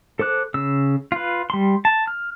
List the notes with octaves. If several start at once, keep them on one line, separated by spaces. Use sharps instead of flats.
A4 C5 D6 F#6
C#3 E6
F4 B4
G3 C6
A5
F6